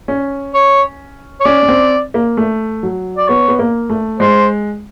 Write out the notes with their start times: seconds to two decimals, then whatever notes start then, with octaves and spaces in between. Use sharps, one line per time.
0.08 C#4
0.54 C#5
1.41 C#5
1.45 C#4 D5
1.63 C#4
1.68 C4
2.14 A#3
2.37 A3
2.83 F#3
3.17 D5
3.28 B3 C#5
3.48 B3
3.59 A#3
3.90 A3
4.20 G#3 C5